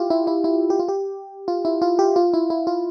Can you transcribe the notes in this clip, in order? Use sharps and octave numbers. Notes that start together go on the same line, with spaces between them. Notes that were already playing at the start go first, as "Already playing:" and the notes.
Already playing: E4 F4 G4
E4
E4
E4
G4
F4
G4
F4
E4
F4
G4
F4
E4
E4
F4